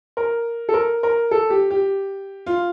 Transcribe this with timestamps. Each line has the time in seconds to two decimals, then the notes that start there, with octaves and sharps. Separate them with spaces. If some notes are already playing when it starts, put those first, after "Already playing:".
0.17 A#4
0.69 A4
0.74 A#4
1.03 A#4
1.31 A4
1.50 G4
1.71 G4
2.46 F4